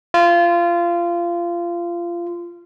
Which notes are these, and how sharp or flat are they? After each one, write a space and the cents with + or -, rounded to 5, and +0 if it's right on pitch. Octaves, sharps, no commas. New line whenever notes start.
F4 -20